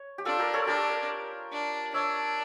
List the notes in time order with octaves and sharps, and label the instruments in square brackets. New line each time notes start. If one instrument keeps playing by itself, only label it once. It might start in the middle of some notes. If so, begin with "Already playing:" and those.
Already playing: [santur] C#5
G4
[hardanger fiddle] D4 [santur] F4 A4
[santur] G4 A#4
A4 C#5
[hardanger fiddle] D4 [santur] G4 A#4
[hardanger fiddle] D4
[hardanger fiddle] D4 [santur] C#5 E5